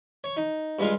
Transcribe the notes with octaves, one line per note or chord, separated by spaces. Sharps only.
C#5
D#4
G2 G#3 F4